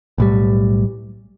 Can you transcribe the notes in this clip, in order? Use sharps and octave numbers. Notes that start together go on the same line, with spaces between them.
B1 A2 G3